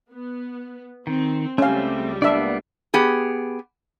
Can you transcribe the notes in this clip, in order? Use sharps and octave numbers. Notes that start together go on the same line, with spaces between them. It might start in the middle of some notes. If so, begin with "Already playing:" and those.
B3
D#3 C4
C#2 G3 A3 C4 C#4 F5
A#3 B3 D4 D5 E5
B3 G4 G#4